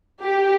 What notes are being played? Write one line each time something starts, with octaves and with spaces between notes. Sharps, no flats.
G4